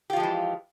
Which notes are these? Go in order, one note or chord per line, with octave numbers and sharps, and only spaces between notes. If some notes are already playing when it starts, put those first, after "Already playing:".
E3 F3 G#3 F4 G4